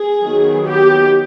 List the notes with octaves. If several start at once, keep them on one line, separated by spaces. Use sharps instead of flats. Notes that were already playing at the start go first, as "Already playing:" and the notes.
Already playing: G#4
D#3 F#3 B3
G4